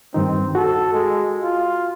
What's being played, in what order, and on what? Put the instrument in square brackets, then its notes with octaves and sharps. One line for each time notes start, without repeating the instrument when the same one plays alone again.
[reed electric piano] G2 D#3 D#4 [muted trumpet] C4
[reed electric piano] F#4 [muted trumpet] A4
[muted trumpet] G#3
F4